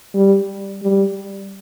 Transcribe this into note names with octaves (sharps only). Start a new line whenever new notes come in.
G3
G3